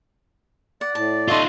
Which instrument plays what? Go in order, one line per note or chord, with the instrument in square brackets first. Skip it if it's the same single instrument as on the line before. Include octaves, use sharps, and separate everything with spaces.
[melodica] D5 [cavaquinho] F#5
[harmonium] A2 [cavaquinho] A5
[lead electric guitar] D#4 F4 [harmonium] A4 D#5 E5 [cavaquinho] C#5 F#5 C6